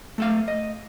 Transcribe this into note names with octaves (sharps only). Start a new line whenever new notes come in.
A3 E5 F5
D#5